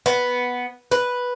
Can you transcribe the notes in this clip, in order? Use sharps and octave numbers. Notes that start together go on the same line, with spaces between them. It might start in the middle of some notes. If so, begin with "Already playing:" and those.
B3
B4